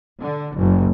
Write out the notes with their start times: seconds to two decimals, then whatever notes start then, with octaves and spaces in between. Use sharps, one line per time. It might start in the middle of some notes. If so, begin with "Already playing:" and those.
0.20 D3
0.56 F#1